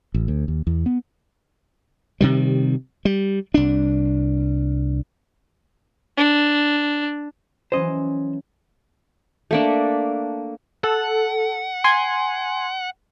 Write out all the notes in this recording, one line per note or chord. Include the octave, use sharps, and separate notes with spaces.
A1
D2
D#2
E2
B3
C3 D#3 G3
G3
C2 D4
D4
E3 F#3 C#4 C5 D#5
A3 A#3 D4
A4 F#5
G#5 C6